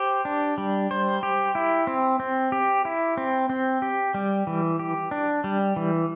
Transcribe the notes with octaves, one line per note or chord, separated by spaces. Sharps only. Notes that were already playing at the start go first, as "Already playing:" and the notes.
Already playing: G4 C5
D4
G3
C5
G4
E4
C4
C4
G4
E4
C4
C4
G4
G3
E3
G4
D4
G3
E3